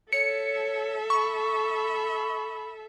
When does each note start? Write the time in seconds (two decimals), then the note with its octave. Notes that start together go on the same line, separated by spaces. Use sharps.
0.13 A4 C#5 E5 C#7
1.10 B5 C#6